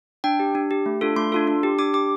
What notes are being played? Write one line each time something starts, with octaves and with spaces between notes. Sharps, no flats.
D4 G5
G4
D4
G4
A3
D4 F4 A4
A3 C6
D4 F4 A4
D4
G4
D4 D6
G4 D6